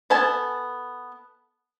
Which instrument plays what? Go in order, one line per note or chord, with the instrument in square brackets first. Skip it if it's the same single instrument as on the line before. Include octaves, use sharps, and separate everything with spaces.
[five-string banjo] B3 A4 G#5 A5